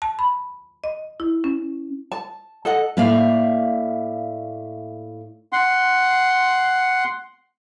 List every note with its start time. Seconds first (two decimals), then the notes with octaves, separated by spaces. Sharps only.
0.02 A5
0.19 B5
0.84 D#5
1.20 E4
1.44 C#4
2.12 A5
2.65 A4 D#5 F#5
2.97 A2 A#3 D5 E5 F5
5.53 F#5 C6